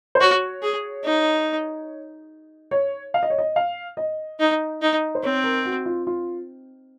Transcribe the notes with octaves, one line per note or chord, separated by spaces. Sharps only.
C5
F#4 C#5
G#4
D#4
C#5
F5
D#5
C#5
D#5
F5
D#5
D#4
D#4
C5
C4 C#5
A#4
F#4
F4
F4